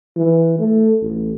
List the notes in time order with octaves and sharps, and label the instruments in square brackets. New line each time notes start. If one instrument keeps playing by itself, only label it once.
[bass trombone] E3
A3
A1